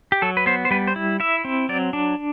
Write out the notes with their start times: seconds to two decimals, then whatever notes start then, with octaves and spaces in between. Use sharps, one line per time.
0.12 G4
0.22 F#3 A4
0.37 B4
0.46 B3 C5
0.65 C5
0.71 G3 B4
0.87 C5
0.96 E4
1.20 E4 E5
1.45 C4
1.69 F#3 D5
1.93 D4